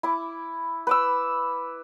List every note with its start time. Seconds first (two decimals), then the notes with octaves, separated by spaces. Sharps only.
0.03 E4 D6
0.87 B4 D6 E6